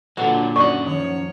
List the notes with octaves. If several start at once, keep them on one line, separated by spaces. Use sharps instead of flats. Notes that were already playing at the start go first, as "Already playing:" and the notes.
A#2 D3 F#3 D4 F4 F#4 A4 B4
F#2 D#4 F#4 D5 F#5 C#6
D#3 F3 C#5